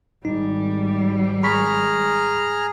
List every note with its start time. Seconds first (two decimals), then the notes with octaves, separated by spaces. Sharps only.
0.25 G#1 G3 D#4
1.43 G#4 A#5 B5 C#6 F6 B6